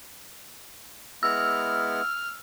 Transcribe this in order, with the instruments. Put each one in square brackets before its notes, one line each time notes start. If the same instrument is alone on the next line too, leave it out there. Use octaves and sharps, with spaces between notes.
[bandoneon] G#3 B3 E4 [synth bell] E6 [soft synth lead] F6